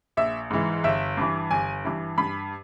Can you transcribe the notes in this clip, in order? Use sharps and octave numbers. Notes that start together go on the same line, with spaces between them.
A#1 E5
G#2 E3
G1 E5
G2 E3
G1 G#5
G2 E3
G2 B5